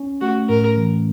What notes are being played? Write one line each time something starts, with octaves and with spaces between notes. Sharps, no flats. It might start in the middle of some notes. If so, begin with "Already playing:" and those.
Already playing: C#4
A3 F#4
A2 A#4
E3